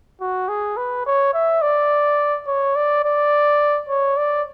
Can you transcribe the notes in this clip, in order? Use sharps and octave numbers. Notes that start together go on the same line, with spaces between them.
F#4
G#4
B4
C#5
E5
D5
C#5
D5
D5
C#5
D5